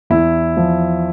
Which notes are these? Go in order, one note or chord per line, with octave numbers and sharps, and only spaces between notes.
E2 E4
F3